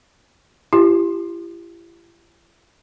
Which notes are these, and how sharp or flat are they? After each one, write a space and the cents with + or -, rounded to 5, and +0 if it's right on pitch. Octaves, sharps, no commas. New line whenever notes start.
E4 +40 G4 +0